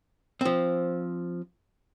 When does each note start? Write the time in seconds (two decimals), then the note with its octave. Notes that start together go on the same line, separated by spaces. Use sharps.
0.41 F3 C4